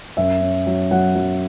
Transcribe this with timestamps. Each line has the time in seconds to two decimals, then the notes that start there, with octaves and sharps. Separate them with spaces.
0.17 F#2 E5
0.41 C#4
0.67 F#3
0.91 F#3 F#5
1.15 F#3